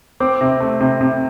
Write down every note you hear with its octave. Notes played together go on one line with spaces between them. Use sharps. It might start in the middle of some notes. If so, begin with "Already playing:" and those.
C4 D6
C3
A3
C3
C3